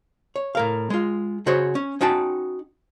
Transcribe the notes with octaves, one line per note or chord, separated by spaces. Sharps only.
C#5
A2 A#4 F5
G#3 F4
C#3 F#4 C5 C#5
C#4
C#4 D#4 F#4 G5 A5